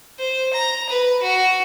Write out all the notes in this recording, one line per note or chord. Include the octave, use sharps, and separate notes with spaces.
C5
A#5
B4
F#4